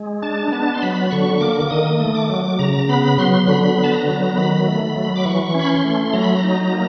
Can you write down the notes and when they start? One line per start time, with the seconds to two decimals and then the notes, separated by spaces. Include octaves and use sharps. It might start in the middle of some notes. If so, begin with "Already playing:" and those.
Already playing: G#3
0.22 D4 A5
0.52 B3 A5
0.74 C6
0.82 F#3 B5
1.11 D3 C#6
1.41 A#3 D6
1.60 D6
1.70 D#3 D#6
2.00 A3
2.15 D6
2.30 F#3
2.59 C#3 A#5
2.89 B3 B5
3.18 F#3 C6
3.48 D3 B5
3.78 B3
3.84 A5
3.93 A#5
4.08 F#3
4.36 D#3 B5
4.67 A3
4.96 F#3
5.16 D6
5.25 E3 C#6
5.55 C#4 B5
5.69 C6
5.85 A3
6.13 F#3 A#5
6.24 B5
6.34 A#5
6.43 D#4
6.72 A#3